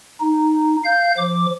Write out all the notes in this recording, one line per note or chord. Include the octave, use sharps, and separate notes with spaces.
D#4
F5 G6
F3 D6